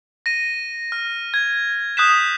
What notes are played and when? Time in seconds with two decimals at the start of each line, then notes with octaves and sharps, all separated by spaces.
0.26 A#6 D#7
0.92 F6
1.34 G#6
1.97 D#6 F#6 G6 B6 E7